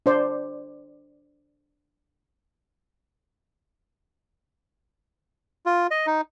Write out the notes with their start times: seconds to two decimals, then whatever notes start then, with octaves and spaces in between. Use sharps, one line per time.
0.06 D4 C5 D5
5.66 F4
5.91 D#5
6.07 D#4